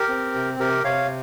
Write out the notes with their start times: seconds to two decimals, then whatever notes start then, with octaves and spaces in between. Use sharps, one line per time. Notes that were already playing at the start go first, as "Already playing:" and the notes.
Already playing: G4 A#4
0.09 C4
0.35 C3
0.59 C3 G4 A#4
0.84 C3 C#5 F5